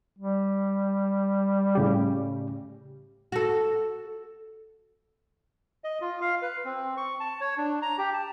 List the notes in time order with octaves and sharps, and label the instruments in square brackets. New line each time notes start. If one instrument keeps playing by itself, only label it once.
[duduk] G3
[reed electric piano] A2 C#3 G4
[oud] F#4 A4
[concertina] D#5
F4
F5
B4
C4
C#6
A5
C#5
D4
A#5
G4
A5